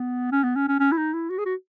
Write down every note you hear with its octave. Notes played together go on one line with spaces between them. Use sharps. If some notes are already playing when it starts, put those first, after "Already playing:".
Already playing: B3
C#4
B3
C#4
C#4
C#4
E4
D#4
E4
F#4
G#4
F#4